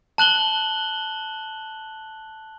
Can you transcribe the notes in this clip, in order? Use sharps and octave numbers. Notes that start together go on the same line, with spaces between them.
A5 F#6 F#7 G7